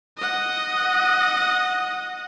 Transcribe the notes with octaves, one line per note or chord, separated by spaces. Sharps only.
D#5 F#5